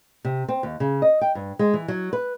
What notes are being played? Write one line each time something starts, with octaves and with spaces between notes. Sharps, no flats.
C3
C4
D#2
C#3
D#5
G5
G2
G#3
E3
F#3
B4